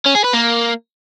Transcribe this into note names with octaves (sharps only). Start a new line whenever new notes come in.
C#4
G#4
B4
A#3